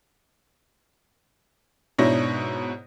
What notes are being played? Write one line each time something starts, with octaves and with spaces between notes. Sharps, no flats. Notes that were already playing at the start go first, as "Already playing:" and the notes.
G#2 B2 D4 E4 C#5 A#6